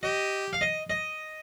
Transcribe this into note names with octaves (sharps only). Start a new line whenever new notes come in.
G4 D#5
F5
D#5
D#5